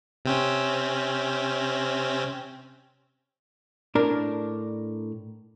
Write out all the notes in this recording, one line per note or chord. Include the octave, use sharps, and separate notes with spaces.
C3 C4 C#4
A2 D4 A#4